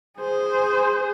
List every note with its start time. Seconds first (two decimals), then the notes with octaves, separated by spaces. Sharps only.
0.18 G#4 C5